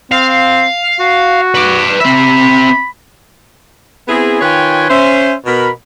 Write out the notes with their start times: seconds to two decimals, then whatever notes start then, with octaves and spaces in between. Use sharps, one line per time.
0.12 C4 F5
1.00 F#4
1.55 B4 D5
2.00 C4 E5 B5
4.08 B3 C4 E4 G#4
4.41 D#3 F4 B4 C#5 G5 G#5
4.89 C#4 C5 E5
5.46 B2 A#4 B5